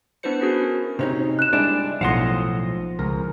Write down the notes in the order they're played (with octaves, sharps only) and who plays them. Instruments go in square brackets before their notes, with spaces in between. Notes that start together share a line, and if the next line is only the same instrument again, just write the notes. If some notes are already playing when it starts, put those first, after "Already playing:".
[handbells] B3 D4 E4 B4 C5 C#7
C#4 E4 F#4 G#4 A#4
[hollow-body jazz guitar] C3 C#4 D#4
[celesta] F#6 E7
[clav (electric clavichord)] G3 G#3 E4 [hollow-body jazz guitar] D4
[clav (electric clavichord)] B1 A2 [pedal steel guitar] F3 D#5 [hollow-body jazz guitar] F5 F#5 C6
[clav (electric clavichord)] C#2 A#4 A#5